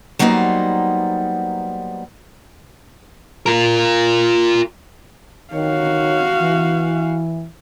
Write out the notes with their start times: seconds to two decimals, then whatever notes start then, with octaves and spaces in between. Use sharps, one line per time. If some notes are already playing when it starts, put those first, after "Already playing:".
0.19 F#3 G3 A#3 B3 D#4 C5
3.46 F4 A#4
5.54 D#3 F#4 C#5 F5
6.40 E3